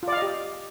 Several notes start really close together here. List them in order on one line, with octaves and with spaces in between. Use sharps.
F4 D5 F5 D#5 G4